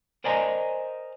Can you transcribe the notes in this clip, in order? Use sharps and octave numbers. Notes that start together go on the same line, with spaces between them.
A#4 C5 D5 D#5 G#5 A#5